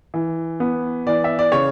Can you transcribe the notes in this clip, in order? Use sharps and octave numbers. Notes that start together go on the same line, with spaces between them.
E3
B3
E3 D5
E5
D5
C#3 C#5